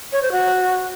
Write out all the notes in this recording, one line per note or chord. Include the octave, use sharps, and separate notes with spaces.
C#5
C5
F#4